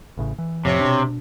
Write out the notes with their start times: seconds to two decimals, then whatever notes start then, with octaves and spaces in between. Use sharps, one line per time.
0.17 A1 A2 C#3
0.38 E3
0.65 F2 A2 C3 F3 C#5
0.81 B2 D4